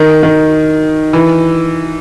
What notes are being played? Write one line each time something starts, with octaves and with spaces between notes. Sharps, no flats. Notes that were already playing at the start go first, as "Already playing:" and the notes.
Already playing: D#3
D#3
E3